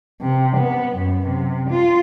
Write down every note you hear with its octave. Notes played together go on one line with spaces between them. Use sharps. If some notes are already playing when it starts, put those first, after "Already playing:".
C3
B3
F#2
C3
F4